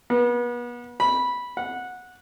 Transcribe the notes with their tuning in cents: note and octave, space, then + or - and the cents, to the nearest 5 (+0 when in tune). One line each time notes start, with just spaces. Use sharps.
B3 -35
B5 -10
F#5 -15